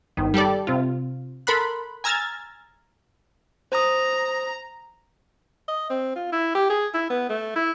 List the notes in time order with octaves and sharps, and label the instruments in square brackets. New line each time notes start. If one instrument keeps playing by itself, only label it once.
[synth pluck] G1 D#3
G3 G4 A4 D5
C3 F4
A4 A#4 B5 C6 F#6
G#5 A#5 E6 F6 G#6 A6
[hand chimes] C5 D#6 [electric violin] A#5
[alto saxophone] D#5
C4
F4
E4
G4
G#4
E4
B3
A3
E4